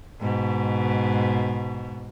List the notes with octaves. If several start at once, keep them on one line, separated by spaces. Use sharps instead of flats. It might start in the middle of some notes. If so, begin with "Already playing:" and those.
G#2 B2